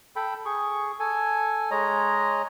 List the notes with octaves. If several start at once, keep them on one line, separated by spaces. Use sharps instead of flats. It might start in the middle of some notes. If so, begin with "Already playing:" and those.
A4 G5 B5
G#4 C#6
A4 G#5
G#3 C#5 D#5 A#5